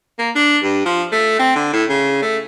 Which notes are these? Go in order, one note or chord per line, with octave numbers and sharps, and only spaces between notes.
A#3
D4
G2
F3
A3
C4
D3
A2
C#3
A3